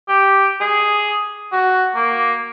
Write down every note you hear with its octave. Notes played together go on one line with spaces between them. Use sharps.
G4
G#4
F#4
A#3